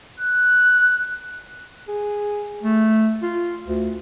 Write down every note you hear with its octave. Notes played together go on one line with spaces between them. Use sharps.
F#6
G#4
A3
F4
D2